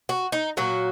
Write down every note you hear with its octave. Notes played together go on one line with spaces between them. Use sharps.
F#4
D#4
A#2 F#3 F#4